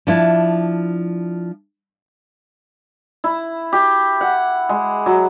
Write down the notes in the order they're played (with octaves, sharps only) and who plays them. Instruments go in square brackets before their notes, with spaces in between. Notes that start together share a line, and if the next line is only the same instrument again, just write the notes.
[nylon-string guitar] F3 D4 E4
[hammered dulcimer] E4
G4
F#5
G#3
F#3